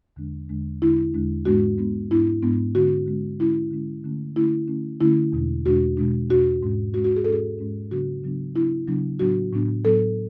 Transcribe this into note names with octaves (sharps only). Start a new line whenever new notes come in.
E2 D3 G#3 D4
E2 D3 G#3 D4
E2 D3 G#3 D4 E4
E2 D3 G#3 D4
G#2 G#3 B3 D4 F#4
G#2 G#3 B3 D4
G#2 G#3 B3 D4 E4
G#2 G#3 B3 D4
D3 G#3 C#4 F#4
D3 G#3 C#4
D3 G#3 C#4 E4
D3 G#3 C#4
D3 A3 C#4
D3 A3 C#4 E4
D3 A3 C#4
D3 A3 C#4 E4
E2 B2 G#3 D4
E2 B2 G#3 D4 F#4
E2 B2 G#3 D4
E2 B2 G#3 D4 F#4
G#2 G#3 C#4
G#2 G#3 C#4 F#4
F#4
G#4
G#2 G#3 C#4 A4
G#4
G#2 G#3 C#4
C#3 F#3 B3 D4 F#4
C#3 F#3 B3 D4
C#3 F#3 B3 D4 E4
C#3 F#3 B3 D4
A2 F#3 B3 D4 F#4
A2 F#3 B3 D4
A2 F#3 B3 D4 A4